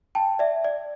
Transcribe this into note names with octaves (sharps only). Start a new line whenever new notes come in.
G5 A5
D5 E5
D5